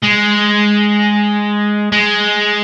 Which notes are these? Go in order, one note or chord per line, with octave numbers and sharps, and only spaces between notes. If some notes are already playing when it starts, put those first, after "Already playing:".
G#3
G#3